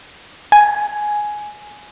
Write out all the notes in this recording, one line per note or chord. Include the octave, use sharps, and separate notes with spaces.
G#5